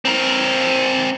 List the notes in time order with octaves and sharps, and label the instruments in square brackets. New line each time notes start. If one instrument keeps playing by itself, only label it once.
[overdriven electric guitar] C4 A#4